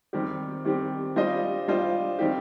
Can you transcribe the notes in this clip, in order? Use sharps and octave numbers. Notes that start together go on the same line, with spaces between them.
D#3 G3 C4 G4
D#3 G3 C4 G4
G3 D4 F4 C5 D#5
G3 D4 F4 C5 D#5
D#3 G3 C4 G4